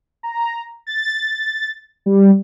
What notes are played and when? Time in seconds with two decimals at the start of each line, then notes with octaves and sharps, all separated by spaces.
0.23 A#5
0.87 A6
2.06 G3